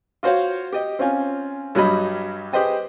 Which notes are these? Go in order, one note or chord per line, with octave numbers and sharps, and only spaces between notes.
F4 F#4 C5 C#5 F5
G4 D#5
C4 C#4 F4 G#5
G2 F#3 G3 D#5 B5
G4 G#4 B4 C5 D#5 G5